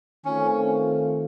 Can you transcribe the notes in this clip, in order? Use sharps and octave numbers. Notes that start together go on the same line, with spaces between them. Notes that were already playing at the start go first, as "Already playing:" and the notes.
D#3 A3 C4 C#4 F4